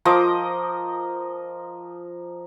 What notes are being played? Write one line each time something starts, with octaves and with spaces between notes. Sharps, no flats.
F3 A#4 D#5 D6